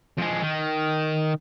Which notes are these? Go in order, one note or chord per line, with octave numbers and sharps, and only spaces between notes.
F2 G#3
D#3